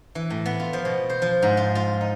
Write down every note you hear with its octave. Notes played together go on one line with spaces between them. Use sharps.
E3
A2
B3
F4
F3
B2
C5
F3
G#2
F4
F4
D#4